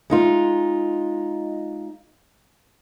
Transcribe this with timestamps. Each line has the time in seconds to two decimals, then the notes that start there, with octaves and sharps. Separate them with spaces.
0.10 G#3 D#4 F4